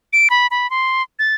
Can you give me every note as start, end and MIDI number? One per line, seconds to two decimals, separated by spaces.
0.13 0.28 98
0.30 0.47 83
0.51 0.69 83
0.70 1.03 84
1.19 1.35 93